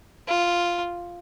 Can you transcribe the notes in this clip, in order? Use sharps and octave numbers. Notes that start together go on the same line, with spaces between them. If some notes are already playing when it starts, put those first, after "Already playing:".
F4